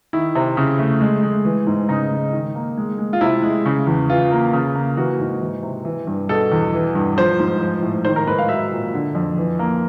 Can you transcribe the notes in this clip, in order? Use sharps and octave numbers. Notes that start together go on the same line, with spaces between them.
D#3 E4
C3
C#3
A3
G#3
G#3
E3
G#2
C#3 D#4
G#3
D#3
A#3
G#3
G#3
F4
C3 E4
G#3
C#3
E2
E3 F4
A#3
C#3
A#3
E3 F#4
G#2
E3
C3
E3
G2
B2 A4
E2
E3
G2
F3 C5
G#2
F3
A2
D#3 C5
A#4
G#2 B4
F5
F#3 E5
A#2
D3
F2
E3
A#3